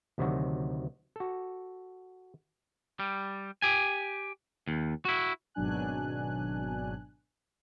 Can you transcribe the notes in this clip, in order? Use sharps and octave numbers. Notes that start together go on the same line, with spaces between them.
D2 C3 D#3 F#3 F#4
F#4 A4
G3
G4 G#5
D#2
E4 F#4
G#1 B2 F#3 D4 G#5 F#6